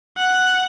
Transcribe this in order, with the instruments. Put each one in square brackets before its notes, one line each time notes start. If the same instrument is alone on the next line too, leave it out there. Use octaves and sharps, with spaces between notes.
[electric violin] F#5